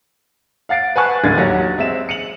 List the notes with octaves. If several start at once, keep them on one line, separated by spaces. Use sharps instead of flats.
F5 F#5 A6 C7 D7
B4 F#5 G#5 A5 C#6 F#6
D1 G#1 D3 G#6 A6
D#2 F#3 G4 F#5 A#6
G#3 C4 E5 E7
C#7 D#7 F7 F#7